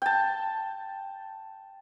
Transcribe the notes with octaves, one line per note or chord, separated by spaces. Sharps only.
G5 A5